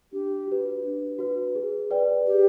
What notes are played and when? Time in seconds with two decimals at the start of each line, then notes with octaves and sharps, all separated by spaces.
0.12 D4 G4
0.48 F#4 B4
0.84 D4
1.19 F#4 B4
1.55 G#4
1.91 B4 D5 G5
2.26 G4 G#4